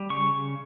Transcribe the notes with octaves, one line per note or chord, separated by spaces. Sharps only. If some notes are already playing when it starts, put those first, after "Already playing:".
Already playing: G3
C#3 C#6